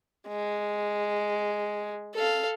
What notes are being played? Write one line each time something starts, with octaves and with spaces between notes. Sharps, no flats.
G#3
A4 F5